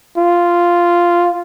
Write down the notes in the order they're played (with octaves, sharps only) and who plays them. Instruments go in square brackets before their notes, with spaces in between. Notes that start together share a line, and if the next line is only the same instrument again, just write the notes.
[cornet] F4